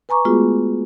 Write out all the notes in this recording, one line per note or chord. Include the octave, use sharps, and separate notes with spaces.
B4 G#5 A#5 C#6 D6
G#3 A3 B3 F4 F#4 G#4